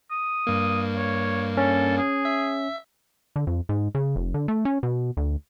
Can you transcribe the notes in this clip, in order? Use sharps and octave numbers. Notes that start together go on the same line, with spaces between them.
D#6
G2 A#3
C#5
C#4 A4
G#4
E5
D3
F2
G#2
C#3
F1
D3
A3
C#4
B2
D2